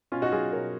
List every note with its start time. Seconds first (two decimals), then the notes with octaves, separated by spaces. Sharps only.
0.12 B2 C#4 F4
0.22 D#4 F#4
0.32 F#3 F4 G#4
0.52 B2 A#4 C#5